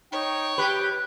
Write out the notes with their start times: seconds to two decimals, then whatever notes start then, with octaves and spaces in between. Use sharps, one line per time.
0.12 D#4 C#5 G5
0.58 G4 B4 F#6